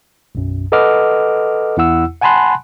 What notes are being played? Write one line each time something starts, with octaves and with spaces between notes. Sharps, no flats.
B1 F#2
A4 B4 D#5 F#5 D6 F6
E2 E4 F#5 E6
F#5 G#5 A5 B5 C6 F#6